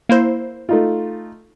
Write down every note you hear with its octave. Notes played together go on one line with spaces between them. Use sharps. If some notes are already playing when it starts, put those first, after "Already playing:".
A#3 E4 C5
A3 D#4 F4